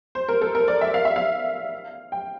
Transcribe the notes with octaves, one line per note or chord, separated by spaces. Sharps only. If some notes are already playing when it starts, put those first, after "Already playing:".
C5
A#4
A4
A#4
D5
E5
F5
E5
F5
G5